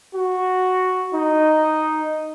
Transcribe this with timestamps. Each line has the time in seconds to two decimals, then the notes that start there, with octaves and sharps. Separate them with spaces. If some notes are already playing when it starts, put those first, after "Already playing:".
0.15 F#4
1.14 D#4